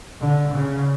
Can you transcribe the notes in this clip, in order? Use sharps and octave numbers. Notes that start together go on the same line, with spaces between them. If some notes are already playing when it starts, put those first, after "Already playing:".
D3
C#3